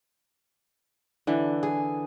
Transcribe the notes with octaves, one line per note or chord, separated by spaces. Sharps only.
D3 E3
G#4